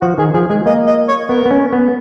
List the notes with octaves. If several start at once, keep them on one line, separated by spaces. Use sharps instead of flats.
F3 F#4
D#3 G#4
F3 G#4
G#3 G#4
A#3 D#5
D#5
C#5
B3 A#4
B3
C#4
B3